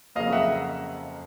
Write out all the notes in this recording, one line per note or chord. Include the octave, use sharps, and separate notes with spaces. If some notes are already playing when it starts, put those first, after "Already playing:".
F2 C#3 F#3 A#3 D#5 F5
E5 F#5